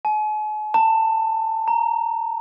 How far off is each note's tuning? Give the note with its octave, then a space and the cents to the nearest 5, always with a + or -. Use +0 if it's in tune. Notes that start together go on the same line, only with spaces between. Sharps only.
G#5 +45
A5 +25
A#5 +0